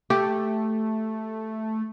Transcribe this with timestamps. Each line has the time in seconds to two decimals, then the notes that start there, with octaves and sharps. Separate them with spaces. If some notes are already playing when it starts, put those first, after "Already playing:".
0.10 A3 G4